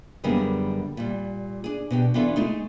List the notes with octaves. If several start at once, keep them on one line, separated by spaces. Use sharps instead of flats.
F#2 D3 G3 A#3 B3 G#4
A#2 G3
D4 G#4
B2 D4 G4
E3 B3 D4 F4 F#4 A4
G#3 A3 D#4